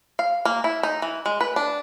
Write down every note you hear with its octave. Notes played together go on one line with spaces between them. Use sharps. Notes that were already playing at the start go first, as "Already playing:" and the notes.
F5
A#3
E4
D#4
E3
G#3
B4
D4